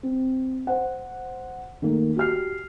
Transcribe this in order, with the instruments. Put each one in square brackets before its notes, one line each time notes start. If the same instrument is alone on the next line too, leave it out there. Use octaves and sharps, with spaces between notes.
[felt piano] C4
C5 F#5
D#3 A3 A#3
F#4 G4 F6 C7